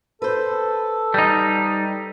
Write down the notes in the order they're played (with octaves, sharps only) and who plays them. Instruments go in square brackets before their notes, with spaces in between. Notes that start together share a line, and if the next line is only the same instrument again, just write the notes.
[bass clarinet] A4 [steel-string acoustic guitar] B4 C5
[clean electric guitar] G3 D#4